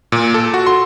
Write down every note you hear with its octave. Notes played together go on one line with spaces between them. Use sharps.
A#2
A4
F#4
C6